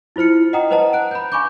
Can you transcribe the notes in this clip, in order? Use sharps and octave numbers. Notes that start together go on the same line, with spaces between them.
E4 F4 C5 F6 C#7
D#5 F#5 G5 A#5 D#6
B4 C5 D#5 F#5 A5 A#5
F#6 D7
B5 G6
F5 G#5 B5 C#6 D6 G6